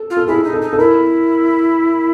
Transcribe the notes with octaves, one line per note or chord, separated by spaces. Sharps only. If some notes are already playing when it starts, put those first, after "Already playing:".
Already playing: A4
F4
A4
E4 G#4
D#4
A4
D#4
A4
E4 A#4